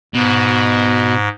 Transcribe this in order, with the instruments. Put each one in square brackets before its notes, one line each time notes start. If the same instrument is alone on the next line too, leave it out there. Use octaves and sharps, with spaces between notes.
[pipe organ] G#2 [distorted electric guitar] B2